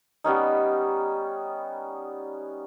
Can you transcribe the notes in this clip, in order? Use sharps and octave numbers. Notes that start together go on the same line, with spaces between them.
G3 B3 C#4 D#4